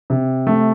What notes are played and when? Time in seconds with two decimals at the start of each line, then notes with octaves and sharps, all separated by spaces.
0.10 C3
0.47 A3